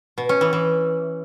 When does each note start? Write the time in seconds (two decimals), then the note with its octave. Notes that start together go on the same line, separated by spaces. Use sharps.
0.18 B2
0.29 C#4
0.41 E3
0.53 E3